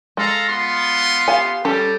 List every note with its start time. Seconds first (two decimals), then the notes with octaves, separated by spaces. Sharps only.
0.17 G#3 A4 F5 A#5
0.48 B3 F4 C6
1.28 G4 F5 G#5
1.65 G3 C#4 G4 A4